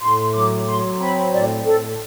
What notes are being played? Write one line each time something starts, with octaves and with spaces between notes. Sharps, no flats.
A2 C6
F#3 D6
F#3 C6
C4 B5
A2 D5
A2 A4